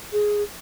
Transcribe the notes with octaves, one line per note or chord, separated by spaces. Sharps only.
G#4